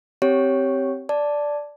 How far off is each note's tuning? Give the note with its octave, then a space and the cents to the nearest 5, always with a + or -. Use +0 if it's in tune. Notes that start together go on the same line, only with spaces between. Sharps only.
C4 +0 G4 -10 C#5 +0
D5 -5 A5 +0